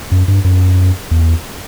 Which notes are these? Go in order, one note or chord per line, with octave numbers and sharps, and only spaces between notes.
F#2
G2
F#2
E2